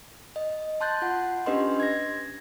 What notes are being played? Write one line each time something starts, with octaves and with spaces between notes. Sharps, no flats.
D#5
A5 C6 F#6 G6 A6
F4 F#5
C#4 D4 G4 B4 D#5 C6
G#6 A#6